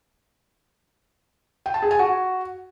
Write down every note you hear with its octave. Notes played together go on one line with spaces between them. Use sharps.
G5
A5
G#4
G#5
F#4